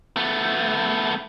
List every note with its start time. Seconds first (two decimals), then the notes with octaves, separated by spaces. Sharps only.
0.17 A3 B3